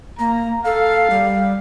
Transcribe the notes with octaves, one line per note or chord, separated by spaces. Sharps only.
A#3 A#5
A4 F5
G3